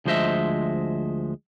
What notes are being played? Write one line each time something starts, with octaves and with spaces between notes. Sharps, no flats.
D2 F3 G#3 C5 D#5 E5